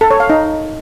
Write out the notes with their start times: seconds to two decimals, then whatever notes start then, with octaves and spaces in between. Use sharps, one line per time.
0.01 A4
0.11 C#5
0.20 F5
0.30 D#4